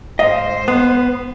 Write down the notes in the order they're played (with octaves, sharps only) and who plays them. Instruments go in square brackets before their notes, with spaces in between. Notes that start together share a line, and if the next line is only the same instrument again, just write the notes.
[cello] G#2 C5 [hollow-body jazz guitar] D#5 F5
[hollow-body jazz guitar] B3